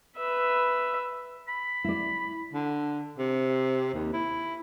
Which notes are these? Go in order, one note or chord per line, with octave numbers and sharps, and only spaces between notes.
B4 E5
B5
E4 D5
D3
C3
D#2
E4